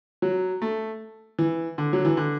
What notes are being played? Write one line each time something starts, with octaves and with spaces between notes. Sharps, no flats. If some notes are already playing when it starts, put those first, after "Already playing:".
F#3
A3
E3
D3
F#3
E3
D3